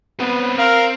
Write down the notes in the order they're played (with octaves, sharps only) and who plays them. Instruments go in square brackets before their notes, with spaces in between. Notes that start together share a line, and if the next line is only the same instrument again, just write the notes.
[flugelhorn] B3 [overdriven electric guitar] C4 B4
[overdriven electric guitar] C4 [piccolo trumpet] A#4 [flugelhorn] F5